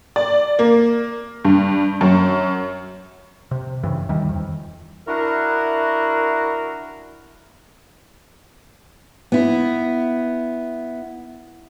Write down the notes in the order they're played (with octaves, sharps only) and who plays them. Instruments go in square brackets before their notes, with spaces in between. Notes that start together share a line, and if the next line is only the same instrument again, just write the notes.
[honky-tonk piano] D5
A#3
G2
F#2
[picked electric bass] C3
G2 C#3 E3
D#2 D#3 E3 G3
F2
[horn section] D4 E4 F#4 A#4
[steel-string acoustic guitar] B3 E4